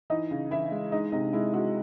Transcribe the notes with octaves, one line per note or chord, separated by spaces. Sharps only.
E3 D#4 D#5
C#3
E3 E4 E5
G#3
G#3 D#4 D#5
C3 D#4 D#5
G#3 E4
G#3 F#4